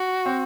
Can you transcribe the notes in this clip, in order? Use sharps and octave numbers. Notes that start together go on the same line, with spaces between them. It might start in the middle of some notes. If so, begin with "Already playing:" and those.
Already playing: F#4
C4